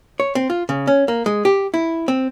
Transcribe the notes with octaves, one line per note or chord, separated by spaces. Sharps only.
C#5
C4
F4
C#3
C#4
A#3
G#3
G4
E4
C4